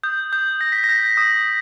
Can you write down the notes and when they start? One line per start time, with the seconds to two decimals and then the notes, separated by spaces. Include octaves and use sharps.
0.03 D#6 G6
0.32 D#6 G6
0.61 G6 A#6
0.72 B6
0.84 A#6
0.89 G6
1.17 D#6